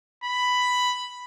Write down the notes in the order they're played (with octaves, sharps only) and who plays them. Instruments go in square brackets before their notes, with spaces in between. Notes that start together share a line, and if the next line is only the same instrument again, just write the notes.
[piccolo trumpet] B5